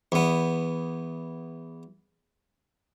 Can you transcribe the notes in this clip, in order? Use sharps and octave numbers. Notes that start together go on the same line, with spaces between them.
E2 B3